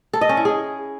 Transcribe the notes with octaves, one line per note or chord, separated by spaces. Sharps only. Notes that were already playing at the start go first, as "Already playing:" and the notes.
A4
D#5
C#4
E4
G#4